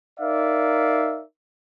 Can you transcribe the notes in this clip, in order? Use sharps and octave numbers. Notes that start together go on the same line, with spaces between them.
D#4 A#4 D5 E5 F5